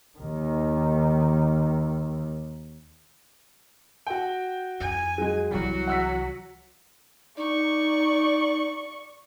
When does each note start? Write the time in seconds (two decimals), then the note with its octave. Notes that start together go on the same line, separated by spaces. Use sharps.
0.19 D#2 D#3
4.07 F#4 G5
4.80 F2 G#5
5.18 F#3 G#3
5.51 C2 E3 F#3 G3 F#4
5.87 F#5 E6 B6
7.37 D#4 D5 C#6